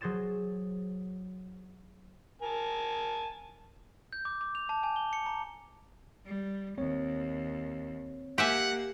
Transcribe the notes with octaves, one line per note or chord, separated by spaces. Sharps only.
F#3 G#4 C5 A6 E7
A#4 G#5 A5
G6
D6
D6
F7
A5
G#5
G7
C#7
A#5
G3
D#2 C4 C#5
A#3 G4 E5 F#5 G#5